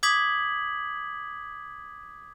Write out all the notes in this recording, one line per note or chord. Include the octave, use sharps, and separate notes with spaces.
D6 D#6 G#6 B6 F#7